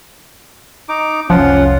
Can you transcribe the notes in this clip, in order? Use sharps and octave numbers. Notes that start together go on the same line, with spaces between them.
D#4 D6
F1 C2 F3 C#4 F4 F#5